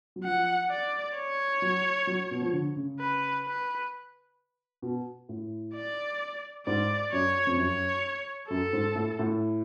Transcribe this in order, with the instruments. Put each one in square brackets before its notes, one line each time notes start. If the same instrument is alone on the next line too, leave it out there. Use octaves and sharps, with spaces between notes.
[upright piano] F#3
[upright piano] F3 [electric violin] F#5
[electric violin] D5
C#5
[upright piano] F#3
F#3
B2
F3
D3
C#3
[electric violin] B4
B4
[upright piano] B2
A2
[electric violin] D5
[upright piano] G#2 [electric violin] D5
[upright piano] F#2 [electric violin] C#5
[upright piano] F2
[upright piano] F#2 [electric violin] C#5
[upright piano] F#2 [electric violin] A4
[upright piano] G#2
A2
A2